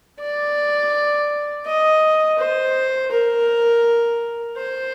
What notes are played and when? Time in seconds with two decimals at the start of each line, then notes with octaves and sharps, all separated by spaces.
0.21 D5
1.66 D#5
2.39 C5
3.11 A#4
4.56 C5